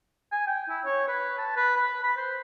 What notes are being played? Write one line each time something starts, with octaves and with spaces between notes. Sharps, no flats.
G#5
G5
E4
C#5
B4
A5
B4
B4
B5
C5